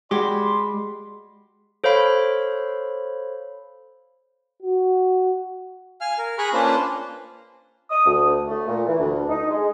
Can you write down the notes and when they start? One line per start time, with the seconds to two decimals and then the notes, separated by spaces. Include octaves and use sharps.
0.11 G#3 F#4 G4 D5 B5 C6
1.84 A4 C5 C#5 F5 B5
4.62 F#4
6.01 F5 G#5 F6
6.18 A#4
6.38 G#4 G#5 A#5 B5 C#6 F#6
6.53 A#3 C#4 D4 F4 B4 C5
7.90 D#6
8.06 D2
8.47 A3
8.68 A#2
8.87 E3
9.00 D2
9.29 D#4
9.50 G#3